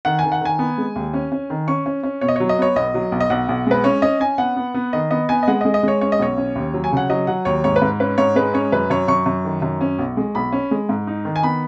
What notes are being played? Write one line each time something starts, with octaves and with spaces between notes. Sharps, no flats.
D#3 F#5
D#3 G#5
F#5
D#3 G#5
B3
G#3
D#2
C#4
C#4
D#3
C#4 C#6
C#4
C#4
B2 C#5
D#5
F#3 C#5
D#5
B3 C#5
B1 D#5
F#3
B1
D#5
B1 F#5
B1
G#3 B4
C#4 C#5
C#4 D#5
C#4 G#5
B3 F#5
B3
B3
D#3 D#5
B3 D#5
B3 G#5
D#5
G#3 F#5
D#5
G#3
D#5
G#3 C#5
C#4 C#5
D#5
B1 C#5
C#4
D#2
F#3
G#5
C#3 F#5
F#3 D#5
F#3 F#5
D#2 C#5
G#2 C#5
B4
G#2
C#4 B4
G#2 C#5
G#3 B4
C#4 C#5
F#2 B4
F#2 C#5
F#2 C#6
F#2
D#3
F#2
C#4
B1
G#3
B1 B5
C#4
G#3
G#2
D#4
D#3
G#5
B3 B5